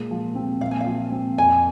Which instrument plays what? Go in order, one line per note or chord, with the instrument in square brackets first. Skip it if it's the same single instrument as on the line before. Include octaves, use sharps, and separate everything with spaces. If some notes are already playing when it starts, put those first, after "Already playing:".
Already playing: [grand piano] A#2 G#3
F3
C4
[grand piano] A#2 [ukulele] F5
[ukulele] G#5
F5
[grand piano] F3
C4
[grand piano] F2 [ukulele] G#5